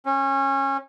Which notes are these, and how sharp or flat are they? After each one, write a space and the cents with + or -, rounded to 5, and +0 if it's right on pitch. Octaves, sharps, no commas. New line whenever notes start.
C#4 -25